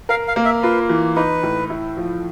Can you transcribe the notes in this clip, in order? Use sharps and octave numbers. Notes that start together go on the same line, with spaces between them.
A#4 F5
F5
A#3
E5
F4 B4
E3
D#4 B4
A2
E4
F3